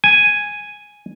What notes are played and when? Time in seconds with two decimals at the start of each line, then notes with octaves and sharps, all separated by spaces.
0.04 G#5